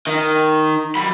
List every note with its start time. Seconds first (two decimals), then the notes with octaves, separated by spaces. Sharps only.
0.07 D#3
0.95 F#3 B5